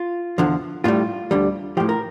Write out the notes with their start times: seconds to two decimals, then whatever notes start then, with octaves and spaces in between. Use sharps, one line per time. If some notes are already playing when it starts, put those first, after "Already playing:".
Already playing: F4
0.38 E2 D3 F3
0.84 A2 G3 F4
1.31 D2 D3 G3
1.77 A2 F3 G4
1.89 A#4